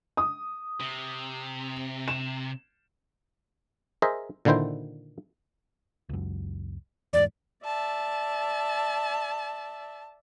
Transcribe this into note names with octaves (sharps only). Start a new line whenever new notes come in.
D#6
C3
E7
G#4 A#4 C5 D#5 E5
A#2 D3 D#3 E4 C5 G5
C#2 F#2
E2 G#2 D5
D5 E5 A5